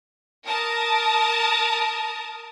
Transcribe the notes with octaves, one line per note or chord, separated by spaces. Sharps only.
A#4 A5 D#6